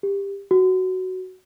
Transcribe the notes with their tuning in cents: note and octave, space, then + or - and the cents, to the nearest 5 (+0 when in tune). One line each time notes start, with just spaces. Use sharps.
G4 +20
F#4 +10